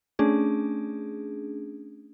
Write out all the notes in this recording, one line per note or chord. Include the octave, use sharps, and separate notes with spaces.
A3 C#4 D4 G#4